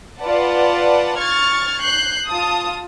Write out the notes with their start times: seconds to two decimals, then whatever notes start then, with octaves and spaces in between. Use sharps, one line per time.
0.21 F4 B4 D5 F#5 A5
1.18 C#6 F6 G#6 A6
1.82 F#6 G6 C7
2.27 F4 A5 D#6